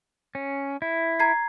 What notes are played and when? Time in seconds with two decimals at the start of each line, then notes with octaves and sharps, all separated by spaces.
0.35 C#4
0.82 E4
1.19 A#5 G#6 C7